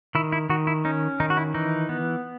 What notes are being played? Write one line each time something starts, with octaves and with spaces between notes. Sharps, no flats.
D#3 E4
E4
D#3 F#4
E4
C#4 D#4
D#3 D#4
F#4
E4
E3 D#4
B3